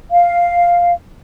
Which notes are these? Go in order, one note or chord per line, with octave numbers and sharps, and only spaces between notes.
F5